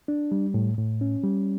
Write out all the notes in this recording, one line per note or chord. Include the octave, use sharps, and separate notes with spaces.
D4
G3
A2
A2
C#4
G3